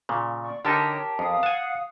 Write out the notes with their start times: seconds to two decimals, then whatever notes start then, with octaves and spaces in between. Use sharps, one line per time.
0.09 A#2 C#3
0.42 D5 C#6
0.65 D3 D#4 G4 A#4 C#5 A5
1.19 F2 F5 D#6
1.43 F#5 G#5 A5